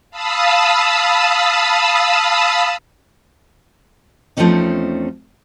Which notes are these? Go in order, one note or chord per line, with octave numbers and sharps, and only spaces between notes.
F5 A5 B5 D#6 E6
E2 F3 A3 C4 C#4 D#4